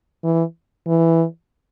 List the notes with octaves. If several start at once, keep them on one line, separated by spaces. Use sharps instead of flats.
E3
E3